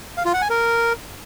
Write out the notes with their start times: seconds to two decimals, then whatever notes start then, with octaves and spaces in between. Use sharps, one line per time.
0.17 F5
0.25 F4
0.34 F#5
0.42 G#5
0.50 A#4